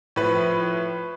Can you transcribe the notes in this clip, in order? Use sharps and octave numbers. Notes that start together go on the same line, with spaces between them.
A2 F3 B4